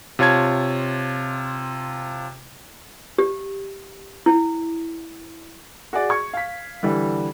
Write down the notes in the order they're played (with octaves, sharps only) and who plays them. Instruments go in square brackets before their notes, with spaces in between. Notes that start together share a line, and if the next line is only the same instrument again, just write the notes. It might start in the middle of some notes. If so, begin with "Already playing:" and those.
[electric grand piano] C3 F4 C#5 A5 G#6
[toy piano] G4
E4
[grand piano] F#4 G#4 D5
C#6 G#6
F5 B6
D3 E3 G3